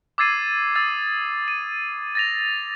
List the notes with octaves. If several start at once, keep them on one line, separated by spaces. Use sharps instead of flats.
D6 E6 G#6 A6 C7 D#7
D#6 E6 A6
D#7
A6 A#6 F7